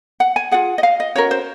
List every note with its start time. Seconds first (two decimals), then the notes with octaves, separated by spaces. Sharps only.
0.20 F#5
0.36 G#5
0.51 F4 G#4 F#5
0.78 D#5
0.83 F5
1.00 D#5
1.16 C#4 F#4 A#4 C#5
1.31 C5